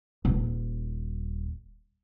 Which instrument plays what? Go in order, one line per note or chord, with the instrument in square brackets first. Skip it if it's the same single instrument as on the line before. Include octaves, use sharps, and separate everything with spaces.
[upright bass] D#1 G#1